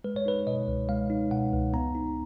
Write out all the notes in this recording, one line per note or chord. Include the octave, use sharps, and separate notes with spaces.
G#3 B4
C#5
D#4 B4
B2 D#5
C#2
G#3 F5
D#4
B2 F#5
C#2
B3 A#5
D#4